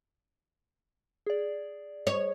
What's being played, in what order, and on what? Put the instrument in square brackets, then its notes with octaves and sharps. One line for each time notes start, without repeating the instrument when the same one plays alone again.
[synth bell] G#4 D5
[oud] C#5